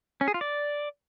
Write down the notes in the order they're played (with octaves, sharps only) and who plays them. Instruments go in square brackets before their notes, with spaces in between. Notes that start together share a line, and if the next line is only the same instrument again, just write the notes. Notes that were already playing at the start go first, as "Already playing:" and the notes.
[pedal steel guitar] C#4
G#4
F4
D5